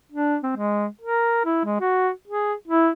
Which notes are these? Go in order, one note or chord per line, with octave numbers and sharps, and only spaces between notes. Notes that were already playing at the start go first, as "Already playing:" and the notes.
D4
C4
G#3
A#4
E4
G#3
F#4
G#4
E4